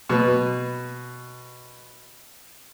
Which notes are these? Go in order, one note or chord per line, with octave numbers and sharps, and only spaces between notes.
B2 B4